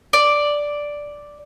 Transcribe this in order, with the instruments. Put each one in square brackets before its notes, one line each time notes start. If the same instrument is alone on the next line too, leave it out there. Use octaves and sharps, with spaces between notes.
[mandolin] D5